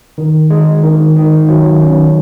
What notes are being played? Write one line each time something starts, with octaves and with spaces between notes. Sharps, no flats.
D#3
G#3
D#3
D#3
F#3
C#4